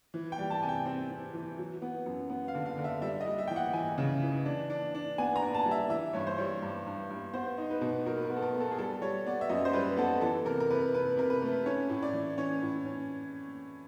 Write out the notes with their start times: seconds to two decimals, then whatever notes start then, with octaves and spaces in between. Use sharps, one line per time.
0.14 E3
0.32 G5
0.39 G3
0.50 A5
0.63 C3 G#5
0.69 G5
0.86 C4
1.10 C4
1.33 E3
1.59 F#3
1.82 B3
2.06 F#2
2.30 B3
2.48 F5
2.55 D3
2.66 F5
2.78 D3
2.84 E5
3.02 G3 E5
3.21 D#5
3.26 G3
3.39 E5
3.47 E3 G5
3.56 F#5
3.73 E3 G#5
3.98 C#3
4.23 E3
4.45 D4
4.70 D4
4.95 D4
5.18 B3 G#5
5.36 A#5
5.42 D4
5.55 A5
5.66 G3
5.71 E5
5.89 E3 E5
6.13 G2 C#5
6.27 C5
6.38 G3 C#5
6.62 G2
6.87 G2
7.10 G2
7.33 B3 C5
7.58 D#4
7.70 B4
7.81 B2
8.06 F#3 A#4
8.17 B4
8.25 A#4
8.30 B3
8.37 A4
8.43 A#4
8.54 B3
8.60 A4
8.71 G#4
8.78 G3 A4
9.02 G3 C#5
9.26 B3 D5
9.41 E5
9.49 F#2 D#5
9.65 C5
9.73 G3 B4
9.97 B3 A4
10.21 E3 A4
10.45 C3 A#4
10.60 A#4
10.70 C3 B4
10.94 C3 B4
11.17 C3 A#4
11.30 B4
11.42 A3
11.66 C#4 C#5
11.89 A2
12.02 D5
12.13 E3
12.38 C#4 C#5
12.62 A2
12.85 C#4